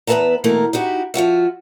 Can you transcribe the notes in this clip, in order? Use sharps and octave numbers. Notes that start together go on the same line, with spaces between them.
E2 B3 B4 E5 A5 A#5
B2 E3 A3 A#3 A4 A#4
D#4 E4 F#4 G4
F3 F4 F#4 E5